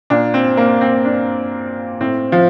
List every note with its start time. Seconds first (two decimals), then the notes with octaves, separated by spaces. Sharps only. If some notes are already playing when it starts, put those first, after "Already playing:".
0.10 A#2 D4
0.34 C4
0.57 A#3
0.81 C4
1.05 D4
2.00 A2 C4
2.32 F3